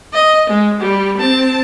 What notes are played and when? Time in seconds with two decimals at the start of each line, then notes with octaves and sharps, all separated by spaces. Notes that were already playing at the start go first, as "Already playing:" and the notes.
0.13 D#5
0.49 G#3
0.80 G3
1.17 C4 A5